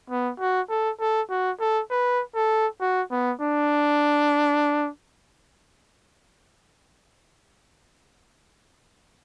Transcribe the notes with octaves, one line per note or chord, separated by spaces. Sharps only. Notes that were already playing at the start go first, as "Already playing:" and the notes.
B3
F#4
A4
A4
F#4
A4
B4
A4
F#4
B3
D4